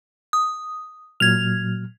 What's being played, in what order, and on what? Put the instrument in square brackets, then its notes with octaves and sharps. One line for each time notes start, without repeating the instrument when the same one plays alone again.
[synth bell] D#6
[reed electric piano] A#2 F#3 F6 [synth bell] G#6 F7